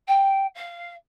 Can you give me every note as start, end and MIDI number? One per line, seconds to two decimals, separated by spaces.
0.07 0.46 79
0.54 0.93 77